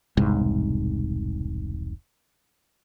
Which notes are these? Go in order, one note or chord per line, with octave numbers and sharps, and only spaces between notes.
E1 C2 G#2